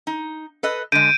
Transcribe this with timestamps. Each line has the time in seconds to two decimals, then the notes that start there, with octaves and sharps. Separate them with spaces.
0.07 D#4
0.63 A4 B4 D#5
0.92 D3 G#3 G6 D7 D#7